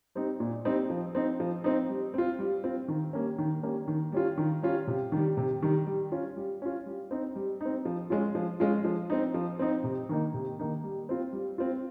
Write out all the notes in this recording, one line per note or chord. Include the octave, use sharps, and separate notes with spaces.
G3 C4 D#4
A#2
G3 C4 D#4
F3
C4 D#4
F3
C4 D#4
G3
C4 F4
G3
C4 F4
D#3
G3 A#3 C#4
D#3
G3 A#3 C#4
D#3
G3 C#4 F4
D#3
G3 C#4 F4
C3
D#3 G3
C3
D#3 G3
G3
C#4 F4
G3
C#4 F4
G3
C4 D#4
G3
C4 D#4
F3
G#3 C#4 F4
F3
G#3 C#4 F4
F3
C4 D#4
F3
C4 D#4
C3
D#3 A#3 D#4
C3
D#3 A#3 D#4
G3
C4 F4
G3
C4 F4